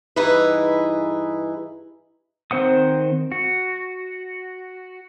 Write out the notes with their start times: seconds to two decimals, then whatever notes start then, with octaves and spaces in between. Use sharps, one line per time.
0.16 G2 E3 D#4 E4 G#4 B4
2.51 D#3 C4 C5 F#5 D#6
3.32 F#4